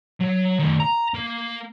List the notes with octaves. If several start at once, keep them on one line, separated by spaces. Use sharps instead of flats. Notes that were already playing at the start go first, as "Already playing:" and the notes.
F#3
D#3 A3
A#5
A#3